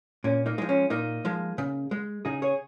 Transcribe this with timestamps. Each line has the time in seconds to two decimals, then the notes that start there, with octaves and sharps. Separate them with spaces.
0.24 A#2 C#4
0.46 A#3 D#4
0.58 F3 G#3
0.69 C#4
0.90 A#2 A#3 D#4
1.25 F3 G#3
1.58 C#3
1.91 G#3
2.25 C#3 D#4 G#4
2.42 G#4 C#5